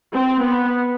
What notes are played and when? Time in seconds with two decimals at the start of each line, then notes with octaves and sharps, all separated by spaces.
0.13 C4
0.42 B3